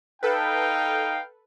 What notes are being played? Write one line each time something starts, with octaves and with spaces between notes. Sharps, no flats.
D#4 A4 B4 F5 G5